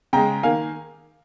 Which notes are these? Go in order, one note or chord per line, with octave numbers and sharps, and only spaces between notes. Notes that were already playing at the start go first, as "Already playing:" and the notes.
C#3 G#3 G5 A#5
D#3 A#3 F5 G#5